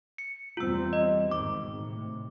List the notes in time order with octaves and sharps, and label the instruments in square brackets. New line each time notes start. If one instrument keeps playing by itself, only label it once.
[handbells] C#7
[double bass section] E2 G3 C4 [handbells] F4 E6
[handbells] D#5
[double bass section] G#1 D#3 [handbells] D6
[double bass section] A2 C3